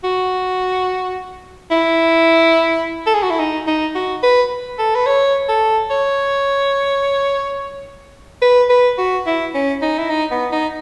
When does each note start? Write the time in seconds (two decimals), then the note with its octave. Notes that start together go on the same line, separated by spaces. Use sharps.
0.04 F#4
1.71 E4
3.06 A4
3.14 G#4
3.23 F#4
3.30 E4
3.39 D#4
3.67 D#4
3.95 F#4
4.23 B4
4.79 A4
4.95 B4
5.06 C#5
5.49 A4
5.91 C#5
8.42 B4
8.69 B4
8.98 F#4
9.27 E4
9.54 C#4
9.82 D#4
9.98 E4
10.10 D#4
10.31 B3
10.52 D#4